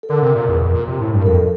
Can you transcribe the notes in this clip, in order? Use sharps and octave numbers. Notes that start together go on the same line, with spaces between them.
A4
D3 A#4
C3
A#2
E2
F2
A#2
C3
A2
G2
A#4
F2 A4